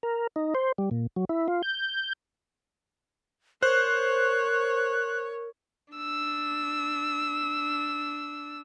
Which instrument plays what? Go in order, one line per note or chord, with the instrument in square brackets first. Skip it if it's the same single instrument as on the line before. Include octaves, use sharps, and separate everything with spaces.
[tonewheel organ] A#4
D#4
C5
G3
A#2
F#3
E4
F4
G6
[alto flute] A#4 [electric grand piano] C5 [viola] C#5 [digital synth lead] F#6
[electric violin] D4 E6